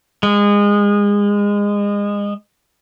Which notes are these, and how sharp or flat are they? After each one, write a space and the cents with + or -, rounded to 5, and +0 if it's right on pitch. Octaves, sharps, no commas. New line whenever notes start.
G#3 -25